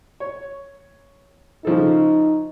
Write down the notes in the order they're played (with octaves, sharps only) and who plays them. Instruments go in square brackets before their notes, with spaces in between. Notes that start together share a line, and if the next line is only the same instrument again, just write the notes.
[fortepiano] C#5
[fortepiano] C#3 F3 A4 [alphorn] D#4